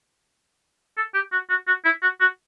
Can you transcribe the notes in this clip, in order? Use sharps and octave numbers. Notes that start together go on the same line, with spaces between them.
A4
G4
F#4
F#4
F#4
E4
F#4
F#4